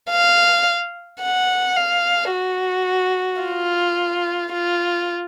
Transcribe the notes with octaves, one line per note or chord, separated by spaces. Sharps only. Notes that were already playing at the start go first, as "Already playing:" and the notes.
F5
F#5
F5
F#4
F4
F4